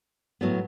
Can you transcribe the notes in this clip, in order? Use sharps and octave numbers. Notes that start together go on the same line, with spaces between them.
A2 F#3 B3